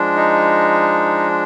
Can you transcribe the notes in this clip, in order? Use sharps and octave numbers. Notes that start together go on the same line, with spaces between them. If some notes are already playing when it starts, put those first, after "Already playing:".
Already playing: F3 G#3 D4
D#4